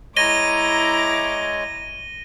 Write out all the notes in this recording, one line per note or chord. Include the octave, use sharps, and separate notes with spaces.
G#3 E4 C#5 A#5 D6 A#6 D#7 G7